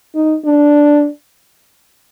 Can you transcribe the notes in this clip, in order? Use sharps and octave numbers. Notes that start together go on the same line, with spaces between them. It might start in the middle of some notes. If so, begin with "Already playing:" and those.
D#4
D4